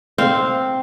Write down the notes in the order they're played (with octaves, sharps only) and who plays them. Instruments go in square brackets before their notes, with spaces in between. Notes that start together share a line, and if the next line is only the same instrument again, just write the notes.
[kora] C4 F5